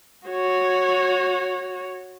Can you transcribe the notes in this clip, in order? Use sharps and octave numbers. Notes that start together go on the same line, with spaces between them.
F#4 C#5